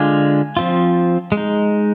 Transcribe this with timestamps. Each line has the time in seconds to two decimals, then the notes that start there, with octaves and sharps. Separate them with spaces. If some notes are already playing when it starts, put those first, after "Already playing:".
Already playing: D3 G#3 D4 F4 G#5
0.57 F3 C4 F4
1.32 G#3
1.37 D#4